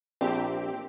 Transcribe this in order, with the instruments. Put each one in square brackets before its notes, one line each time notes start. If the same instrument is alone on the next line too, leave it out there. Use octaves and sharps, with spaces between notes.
[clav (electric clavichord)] A#1 [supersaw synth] C4 G4